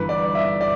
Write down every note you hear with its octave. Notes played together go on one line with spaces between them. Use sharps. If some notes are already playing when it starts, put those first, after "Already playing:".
Already playing: G1 G2 E3 B4
D5
E5
D5